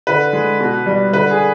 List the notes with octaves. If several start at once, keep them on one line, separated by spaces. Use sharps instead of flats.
D3 B4
G#3
B2
G3
D3 B4
G#4